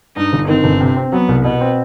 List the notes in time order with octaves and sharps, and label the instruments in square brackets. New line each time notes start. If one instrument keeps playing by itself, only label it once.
[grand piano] G2 [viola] D#4
[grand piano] G1
[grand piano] D#3 [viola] C4
[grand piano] G1
C3
C4
[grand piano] F#3 [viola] B3
[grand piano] C2
[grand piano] B2 [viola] B3
[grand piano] C4